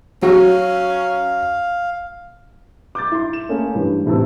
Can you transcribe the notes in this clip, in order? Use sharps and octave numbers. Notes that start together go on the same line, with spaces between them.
F#3 C#4 F#4 F5
D6 G6 A6
E4 C6
E7
A3 A#3 C#4 G#4
G2 E3
E2 A2 C3 A5 E6